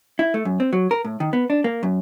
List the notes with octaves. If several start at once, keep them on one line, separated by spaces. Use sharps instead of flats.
E4
A3
F#2
C4
F#3
A#4
A2
D#3
B3
D4
A#3
F#2